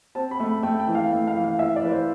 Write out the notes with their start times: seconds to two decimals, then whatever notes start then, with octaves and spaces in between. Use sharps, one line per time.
0.15 C4 A5
0.31 B5
0.40 A3
0.48 B5
0.63 A3 G5
0.80 G5
0.88 E3
0.95 F5
1.12 A3
1.27 F5
1.36 E3
1.44 F5
1.59 E3 E5
1.76 D5
1.83 E3 B4
1.92 C5